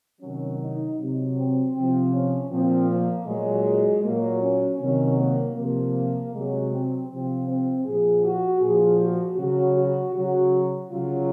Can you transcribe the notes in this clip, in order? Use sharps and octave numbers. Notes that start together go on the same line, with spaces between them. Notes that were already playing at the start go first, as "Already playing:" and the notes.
C3 D#3 F#3 C#4
D#4
C3 F#3
C4
C3 F3 C4
C#4
A#2 F3 C4
A#3
A#2 F#3 G#3
A#2 F#3 A#3
C#4
C3 D#3 F#3 C#4
A#3
C3 F3 A#3
C3 F#3 G#3
C4
C3 F3 C4
C4
A#2 F3 G#4
F#4
A#2 F3 G#4
F#4
C#3 F#3 F#4
F#4
C#3 F#3 F#4
C#3 F#3 F4